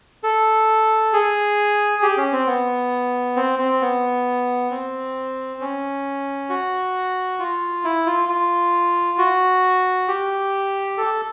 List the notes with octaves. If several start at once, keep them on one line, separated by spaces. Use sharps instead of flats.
A4
G#4
G4
C#4
C4
B3
C4
C4
B3
C4
C#4
F#4
F4
E4
F4
F4
F#4
G4
A4